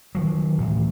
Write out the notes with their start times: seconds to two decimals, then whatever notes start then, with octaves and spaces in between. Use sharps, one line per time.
0.15 D#3 F3 F#3
0.58 D2 A2 E3